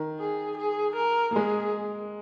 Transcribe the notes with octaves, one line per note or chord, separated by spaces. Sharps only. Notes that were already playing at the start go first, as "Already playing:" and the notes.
Already playing: D#3
G#4
G#4
A#4
A#3
G#3 G#4